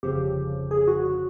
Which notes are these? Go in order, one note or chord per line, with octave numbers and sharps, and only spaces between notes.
G1 F2 C#3 F3 G4
G#4
F#4
F#4